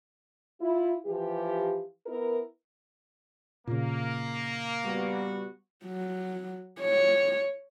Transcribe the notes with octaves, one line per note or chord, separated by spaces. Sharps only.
E4 F4
E3 F3 G4
B3 E4 A#4
A#2 C#3 A#3
G3 B3 F#4
F#3
C#5